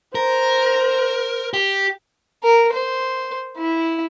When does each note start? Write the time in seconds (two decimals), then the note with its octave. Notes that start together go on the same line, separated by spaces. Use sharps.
0.15 A#4 C5
1.54 G4
2.44 A#4
2.73 C5
3.58 E4